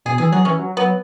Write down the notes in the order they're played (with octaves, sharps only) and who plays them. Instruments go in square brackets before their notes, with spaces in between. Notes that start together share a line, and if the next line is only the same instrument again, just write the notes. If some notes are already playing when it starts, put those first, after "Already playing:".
[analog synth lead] B2 [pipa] G#4
[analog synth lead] E3 [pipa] G#4
[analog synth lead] F#3 [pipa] G#4
[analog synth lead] E3 [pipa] C#4
[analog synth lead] F#3
[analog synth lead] F#3 [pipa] B3